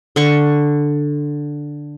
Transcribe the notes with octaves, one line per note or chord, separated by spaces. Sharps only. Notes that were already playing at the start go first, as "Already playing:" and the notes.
D3 C#6